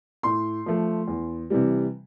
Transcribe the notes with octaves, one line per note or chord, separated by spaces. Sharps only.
A2 C6
F3 A3
E2
C3 E3 G3